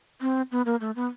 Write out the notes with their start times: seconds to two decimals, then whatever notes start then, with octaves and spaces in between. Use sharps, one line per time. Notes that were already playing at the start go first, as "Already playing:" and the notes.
0.21 C4
0.52 B3
0.66 A#3
0.81 A3
0.96 B3